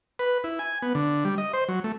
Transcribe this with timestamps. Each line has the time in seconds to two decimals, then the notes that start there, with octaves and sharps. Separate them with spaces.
0.19 B4
0.44 E4
0.59 G#5
0.82 B3
0.95 D3
1.25 G3
1.38 D#5
1.53 C5
1.68 F#3
1.84 A3